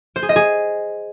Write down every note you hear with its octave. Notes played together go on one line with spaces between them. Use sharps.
C5
G#4
D#5
G#4